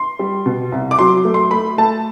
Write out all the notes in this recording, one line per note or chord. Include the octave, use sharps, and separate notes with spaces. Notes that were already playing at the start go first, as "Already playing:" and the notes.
Already playing: C6
G3
B2
C2
D6
F#3 C6
A3
C6
A3 B5
A3 A5